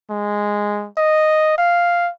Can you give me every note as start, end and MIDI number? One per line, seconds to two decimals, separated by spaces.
0.10 0.88 56
0.98 1.56 75
1.58 2.11 77